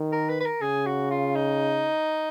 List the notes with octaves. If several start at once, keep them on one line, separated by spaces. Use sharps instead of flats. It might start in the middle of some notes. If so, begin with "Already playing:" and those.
Already playing: D#3
A#4
B4
B4
A#4
C#3 G#4
F#4
F4
D#4